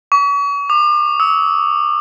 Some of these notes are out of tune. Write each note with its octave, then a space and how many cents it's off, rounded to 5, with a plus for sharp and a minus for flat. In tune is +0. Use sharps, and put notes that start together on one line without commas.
C#6 +40
D6 +40
E6 -35